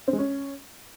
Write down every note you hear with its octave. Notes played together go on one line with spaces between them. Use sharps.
C4
G#3
C#4